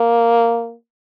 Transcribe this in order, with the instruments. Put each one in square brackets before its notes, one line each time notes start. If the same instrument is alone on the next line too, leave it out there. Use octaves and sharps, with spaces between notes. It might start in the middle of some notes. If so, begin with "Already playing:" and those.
Already playing: [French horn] A#3